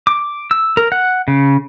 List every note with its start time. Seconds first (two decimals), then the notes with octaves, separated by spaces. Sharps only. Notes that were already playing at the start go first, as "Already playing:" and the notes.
0.07 D6
0.51 E6
0.77 A#4
0.92 F#5
1.28 C#3